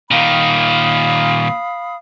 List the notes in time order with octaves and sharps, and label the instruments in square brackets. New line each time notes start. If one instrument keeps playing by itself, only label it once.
[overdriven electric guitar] A#2 D#3 [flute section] F5 B5 D#6